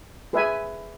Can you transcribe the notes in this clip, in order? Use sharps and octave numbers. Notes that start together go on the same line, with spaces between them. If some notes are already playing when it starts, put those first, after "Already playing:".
G#4 B4 E5 G#5